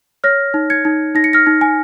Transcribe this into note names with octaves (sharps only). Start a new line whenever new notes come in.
C#5 F6 A#6
D#4
G#6 C#7
D#4
D#4 A#6
C#7
F6 A#6
D#4
G#5